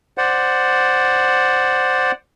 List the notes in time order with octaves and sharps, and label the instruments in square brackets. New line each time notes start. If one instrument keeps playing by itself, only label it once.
[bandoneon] C5 D5 F#5